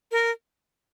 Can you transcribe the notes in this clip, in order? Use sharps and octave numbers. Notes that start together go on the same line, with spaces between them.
A#4